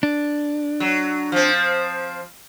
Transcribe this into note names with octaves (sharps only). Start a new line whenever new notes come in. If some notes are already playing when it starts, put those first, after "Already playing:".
D4
F#3
F3 C4